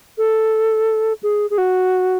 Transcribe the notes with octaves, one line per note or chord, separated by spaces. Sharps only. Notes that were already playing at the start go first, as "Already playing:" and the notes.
A4
G#4
G#4
F#4